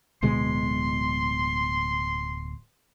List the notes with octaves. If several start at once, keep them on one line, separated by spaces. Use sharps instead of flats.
D1 B2 G#3 C6